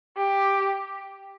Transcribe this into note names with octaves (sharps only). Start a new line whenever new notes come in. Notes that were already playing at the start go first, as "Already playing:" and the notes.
G4